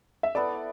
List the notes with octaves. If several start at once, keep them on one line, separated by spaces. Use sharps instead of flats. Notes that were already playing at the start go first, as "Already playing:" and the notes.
E5
B3 E4 A4 D5